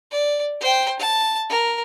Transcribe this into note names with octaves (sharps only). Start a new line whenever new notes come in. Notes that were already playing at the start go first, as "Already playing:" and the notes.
D5
C5 G5
A5
A#4